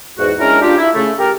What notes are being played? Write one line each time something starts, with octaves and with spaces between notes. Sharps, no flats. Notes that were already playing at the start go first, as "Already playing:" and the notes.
E2 G#2 F#4
G#3 C#4 D4 E4 A#4
D4 F4 G4
E4
C#3 A3
G4 A#4